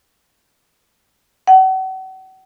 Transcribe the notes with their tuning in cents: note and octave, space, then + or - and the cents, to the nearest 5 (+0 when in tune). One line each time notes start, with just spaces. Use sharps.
F#5 +40